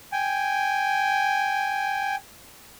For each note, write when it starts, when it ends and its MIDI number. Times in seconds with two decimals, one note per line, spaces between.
0.12 2.16 79
0.12 2.16 80